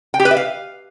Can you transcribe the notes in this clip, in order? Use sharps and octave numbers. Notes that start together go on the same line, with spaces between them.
G5
G4
B4
E5
F5